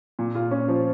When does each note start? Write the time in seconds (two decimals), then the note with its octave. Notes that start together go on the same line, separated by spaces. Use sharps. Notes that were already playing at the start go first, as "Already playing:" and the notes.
0.19 A#2
0.35 F4
0.51 C#4
0.68 F3